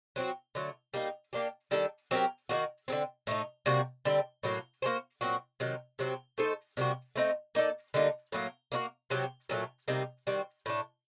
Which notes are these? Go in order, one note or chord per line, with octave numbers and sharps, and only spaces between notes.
F#3 C4 F#4
D3 F#3 A3
G3 A#3 D#4
A#3 D4 G4
D#3 G3 D4 A4
F#3 C4 G4 A#4
D#3 G3 A#3 F#4
D3 F#3 C4
A2 A3 D#4
C3 G3 A#3 F#4
D3 G3 C4
A2 F#3 A#3
A#3 F#4 A4 C5
A#2 F#3 C4 F#4
C3 D#3 F#3
C3 F#3 C4
A3 D#4 A4 C5
C3 G3 A#3 F#4
A3 C4 D#4
A#3 D#4 A4 D5
D3 G3 A#3 D#4
A2 F#3 A#3
A#3 D#4 F#4
C3 F#3 C4 G4
A#2 F#3 A3
C3 G3 A#3 D#4
D#3 G3 C4 F#4
A2 A3 D4